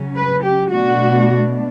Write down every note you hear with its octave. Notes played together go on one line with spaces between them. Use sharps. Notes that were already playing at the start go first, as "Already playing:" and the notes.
Already playing: C#3 F#3 C#4
B4
G4
B2 A3 D4 F#4